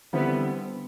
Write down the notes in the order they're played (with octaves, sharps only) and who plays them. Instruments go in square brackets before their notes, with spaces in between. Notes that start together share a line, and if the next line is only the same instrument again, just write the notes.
[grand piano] D3 G3 C4 E4 [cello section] B3